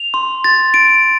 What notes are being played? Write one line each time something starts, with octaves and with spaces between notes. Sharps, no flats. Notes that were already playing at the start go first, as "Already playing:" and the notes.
Already playing: F7
C6
A6
D7